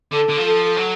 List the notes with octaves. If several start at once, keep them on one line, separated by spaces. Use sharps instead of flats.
D3 A4
D3
F3
A4
F#3